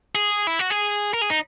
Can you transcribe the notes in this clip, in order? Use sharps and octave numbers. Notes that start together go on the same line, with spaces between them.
G#4
E4
F#4
G#4
A#4
G#4
D#4